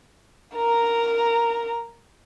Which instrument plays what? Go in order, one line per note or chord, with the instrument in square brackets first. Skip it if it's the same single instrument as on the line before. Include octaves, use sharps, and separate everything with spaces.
[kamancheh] A#4 A#5